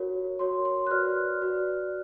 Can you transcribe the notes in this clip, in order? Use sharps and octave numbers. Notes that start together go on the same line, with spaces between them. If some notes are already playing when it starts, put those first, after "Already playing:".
Already playing: F#4 A#4 C#5
F#4 A#4 C#5 C6
C6
F#6
F#4 B4 D5 F6
F#4 B4 D5